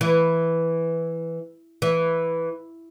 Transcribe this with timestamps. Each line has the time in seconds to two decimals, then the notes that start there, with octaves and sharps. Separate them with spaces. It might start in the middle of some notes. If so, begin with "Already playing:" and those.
0.01 E3
1.82 E3